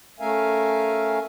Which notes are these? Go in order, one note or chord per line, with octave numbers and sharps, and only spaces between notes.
A3 C#4 A#4 E5 F5 G#5